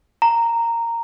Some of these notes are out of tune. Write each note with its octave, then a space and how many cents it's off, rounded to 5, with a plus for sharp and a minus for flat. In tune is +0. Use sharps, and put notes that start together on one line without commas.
A#5 -10